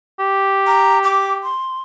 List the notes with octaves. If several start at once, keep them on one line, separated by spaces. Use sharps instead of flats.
G4
A#5
D6
C6